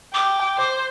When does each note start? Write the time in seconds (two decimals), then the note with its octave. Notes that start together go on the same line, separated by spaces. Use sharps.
0.14 G5 D6
0.58 C5